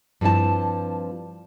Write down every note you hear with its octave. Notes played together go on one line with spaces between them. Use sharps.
G2 F3 C4 E4 A5